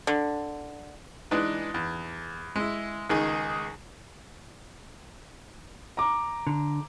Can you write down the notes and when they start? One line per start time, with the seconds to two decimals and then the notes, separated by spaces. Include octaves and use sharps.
0.07 D3
1.31 E3 G#3 D4 D#4 B4
1.74 E2
2.56 G#3 E4
3.09 C#2 D#3 D#4 G#4
5.97 A#5 D6
6.47 D3